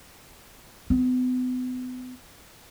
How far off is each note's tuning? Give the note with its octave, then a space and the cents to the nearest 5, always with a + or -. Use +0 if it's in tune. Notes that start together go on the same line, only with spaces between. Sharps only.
B3 +40